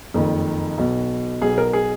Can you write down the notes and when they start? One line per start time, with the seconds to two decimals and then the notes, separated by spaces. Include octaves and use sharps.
0.14 F#1 F2 D#3
0.78 B1 B2
1.41 B1 B2 G#4
1.58 A#4
1.73 G#4